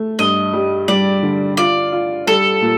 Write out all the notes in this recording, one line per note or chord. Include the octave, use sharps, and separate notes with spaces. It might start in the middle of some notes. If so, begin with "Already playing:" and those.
Already playing: A3
G2 D#5
G3
G3 D5
D3
F4 D5
F4
G3 A4
A#2